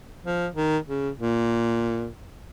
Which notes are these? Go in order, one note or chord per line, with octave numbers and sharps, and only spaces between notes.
F3
D#3
C#3
A#2